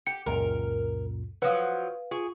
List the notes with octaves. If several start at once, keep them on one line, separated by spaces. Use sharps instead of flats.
G4 C#7
C#2 F#2 A#2 A#4
F3 F#3 B4 C#5 F5 D#6
F4 G#4 C#6